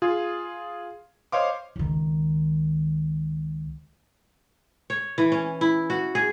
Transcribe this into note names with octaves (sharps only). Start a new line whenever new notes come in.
F4 G#4
C5 C#5 D#5 F5 C6 D6
C#2 D#3
C#5
E3
C#4
E4
F#4
G#4